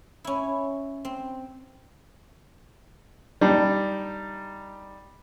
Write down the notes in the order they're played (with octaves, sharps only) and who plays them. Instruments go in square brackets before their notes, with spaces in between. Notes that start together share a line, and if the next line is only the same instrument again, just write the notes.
[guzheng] C#4 E4
C4
[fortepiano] G3 D4 D#4